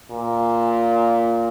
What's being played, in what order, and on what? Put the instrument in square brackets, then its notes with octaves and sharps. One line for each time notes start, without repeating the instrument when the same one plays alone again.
[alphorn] A#2